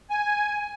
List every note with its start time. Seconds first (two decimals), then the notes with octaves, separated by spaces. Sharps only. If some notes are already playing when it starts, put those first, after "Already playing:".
0.10 G#5